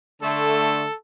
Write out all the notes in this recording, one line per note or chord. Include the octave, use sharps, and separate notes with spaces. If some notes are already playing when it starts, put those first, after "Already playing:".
D3 A3 A4